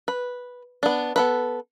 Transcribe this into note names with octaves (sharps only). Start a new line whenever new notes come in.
B4
B3 D4
B3 A4 B4